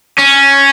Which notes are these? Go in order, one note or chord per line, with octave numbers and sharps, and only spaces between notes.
C#4